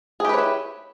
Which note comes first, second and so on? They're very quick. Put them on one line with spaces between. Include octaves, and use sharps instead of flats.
G#4 G4 B4 C#5 E4